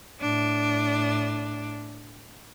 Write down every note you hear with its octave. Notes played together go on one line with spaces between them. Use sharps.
A2 D4